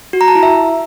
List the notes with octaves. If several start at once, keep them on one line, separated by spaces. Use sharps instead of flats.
F#4
A#5
A5
E4
E5